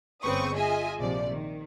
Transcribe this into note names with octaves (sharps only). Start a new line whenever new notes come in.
G1 C#3 C4 B4 C#6 D#6
F4 G#4 D#5 E5 G#5
A#1 C3 F3 D5
D#3